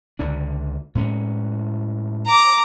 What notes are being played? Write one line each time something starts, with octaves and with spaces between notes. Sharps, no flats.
C#2 D3 D4
A2 G#3 C#4
A#5 D6